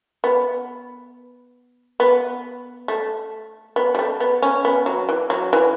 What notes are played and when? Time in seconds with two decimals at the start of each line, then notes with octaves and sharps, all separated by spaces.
0.24 B3
2.00 B3
2.88 A3
3.76 B3
3.95 G3
3.99 A3
4.20 B3
4.42 C#4
4.65 B3
4.86 F#3
5.09 E3
5.30 F#3
5.53 E3